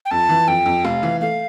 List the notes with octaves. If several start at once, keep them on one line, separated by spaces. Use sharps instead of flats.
G5
F2 A5
E3
F2 G5
F2
F1 F5
E3
A3 F5